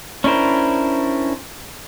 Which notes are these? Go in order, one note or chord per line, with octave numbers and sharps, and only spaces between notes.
C#4 D4 E4 A#4 C5